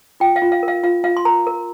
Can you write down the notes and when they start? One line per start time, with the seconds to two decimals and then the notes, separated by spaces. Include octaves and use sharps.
0.20 F4 G5
0.36 F5
0.42 F4
0.52 F5
0.63 A#4
0.68 F5
0.83 F4 F5
1.04 F4 F5
1.17 C6
1.25 A#4 A#5
1.47 A#4